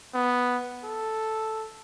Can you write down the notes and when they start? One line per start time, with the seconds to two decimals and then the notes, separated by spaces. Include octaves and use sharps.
0.14 B3
0.84 A4